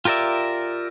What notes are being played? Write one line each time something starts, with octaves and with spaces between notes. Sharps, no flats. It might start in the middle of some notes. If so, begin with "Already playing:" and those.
F4 G4 A#4 D5 E5